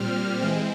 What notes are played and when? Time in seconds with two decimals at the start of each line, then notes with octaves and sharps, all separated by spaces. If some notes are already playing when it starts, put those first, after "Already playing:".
Already playing: A#2 G3 C4 F6
0.41 E3 G#3 C4